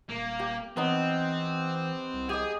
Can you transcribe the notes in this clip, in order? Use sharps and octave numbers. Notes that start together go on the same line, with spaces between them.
D#1 A#3
G4
E3 B3 C4 D#4
C2
G4 G#4 D#5